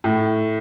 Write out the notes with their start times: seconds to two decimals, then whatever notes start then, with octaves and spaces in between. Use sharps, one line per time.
0.04 A2